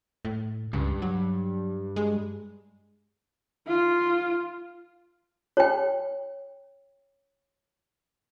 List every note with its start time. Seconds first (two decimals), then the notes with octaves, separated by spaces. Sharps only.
0.25 A2
0.73 C#2 G2
1.02 F#3
1.96 G#3
3.67 F4
5.57 C#5 G5